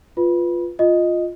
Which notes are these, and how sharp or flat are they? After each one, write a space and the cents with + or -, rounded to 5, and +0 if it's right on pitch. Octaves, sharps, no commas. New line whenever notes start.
F4 +0 B4 +0 B5 -25
F4 +5 D#5 +0